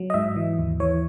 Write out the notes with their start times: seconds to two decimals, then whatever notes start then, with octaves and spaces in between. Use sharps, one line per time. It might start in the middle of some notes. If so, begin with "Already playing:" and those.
Already playing: F#3
0.10 D#5
0.14 G#2 E5
0.36 E3
0.58 D#2
0.80 E3 C#5